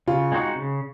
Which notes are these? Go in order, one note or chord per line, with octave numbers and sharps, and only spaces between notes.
C#3 F4
G#3 C4 D#4 F#4
C#3